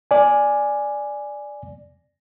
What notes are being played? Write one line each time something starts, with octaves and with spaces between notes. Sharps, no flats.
D5 G#5